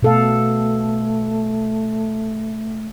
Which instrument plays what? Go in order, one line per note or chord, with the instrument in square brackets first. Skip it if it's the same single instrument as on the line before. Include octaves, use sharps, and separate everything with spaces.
[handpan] B2 A4 F5 [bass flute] A3